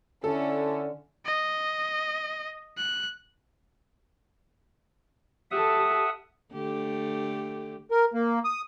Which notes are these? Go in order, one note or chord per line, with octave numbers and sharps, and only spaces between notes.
D3 C#4 E4 A4
D#5
F#6
G4 A4 E5 F#5 D#6
D3 A3 G4
A#4
A#3
D#6